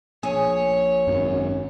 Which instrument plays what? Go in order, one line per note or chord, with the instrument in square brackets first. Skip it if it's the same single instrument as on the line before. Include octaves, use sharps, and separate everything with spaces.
[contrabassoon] A#1 [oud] G#4 [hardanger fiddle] C#5
[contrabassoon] G#1 [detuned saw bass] F#2